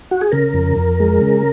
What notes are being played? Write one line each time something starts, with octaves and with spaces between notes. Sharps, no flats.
F#4
G#4
C#3 A#4
F2
F2
G#3
C#3